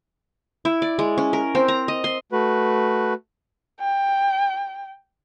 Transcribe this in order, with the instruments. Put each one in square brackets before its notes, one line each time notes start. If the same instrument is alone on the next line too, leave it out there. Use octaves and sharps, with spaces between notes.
[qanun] E4
D5
G#3
C#4
A#4
C4
A#5
D#5
C6
[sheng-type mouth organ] A3 F#4 B4
[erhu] G5